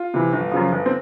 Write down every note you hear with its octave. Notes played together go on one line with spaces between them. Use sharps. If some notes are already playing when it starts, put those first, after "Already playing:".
Already playing: F4
C3 E3
G1
F#2 C#3 F3
G1
C4